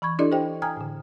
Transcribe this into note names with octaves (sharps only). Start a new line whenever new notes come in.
E3 B5 C#6 G#6
D4 E4 G4 A4 D5 D#5
G4 C5 D#5 G5
G5 G#5 A#5 D#6 F6 G#6
A2 D3